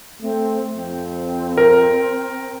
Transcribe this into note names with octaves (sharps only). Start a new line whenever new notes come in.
A3 C4
F2 C4
A#4